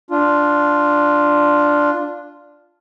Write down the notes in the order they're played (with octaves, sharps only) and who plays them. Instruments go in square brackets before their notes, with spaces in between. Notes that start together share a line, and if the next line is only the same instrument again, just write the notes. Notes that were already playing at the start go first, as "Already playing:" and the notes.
[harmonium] D4 F4